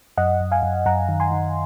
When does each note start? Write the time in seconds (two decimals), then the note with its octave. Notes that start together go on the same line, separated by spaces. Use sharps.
0.18 F#2 D#5 F#5
0.41 F#2
0.51 F5 G#5
0.63 F#2
0.86 F#2 F#5 A#5
1.09 D#3
1.20 G#5 C6
1.31 D#3